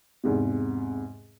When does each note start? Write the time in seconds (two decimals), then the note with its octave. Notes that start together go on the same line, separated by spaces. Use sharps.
0.24 E2 G#2 C3